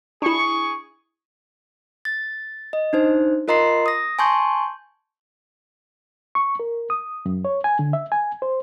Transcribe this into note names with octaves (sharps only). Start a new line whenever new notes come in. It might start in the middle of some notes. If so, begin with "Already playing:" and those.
D4 E4 G#4 C#6
A6
D#5
D4 D#4 C5
F4 A#4 D#5 A#5 C6 C7
D#6 A#6
G#5 A5 C6 C#6 G6
C#6
A#4
D#6
F#2
C#5
G#5
D3
E5
G#5
C5